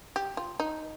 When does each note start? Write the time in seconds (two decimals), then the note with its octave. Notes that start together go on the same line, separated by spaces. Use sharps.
0.16 G4
0.37 F4
0.60 D#4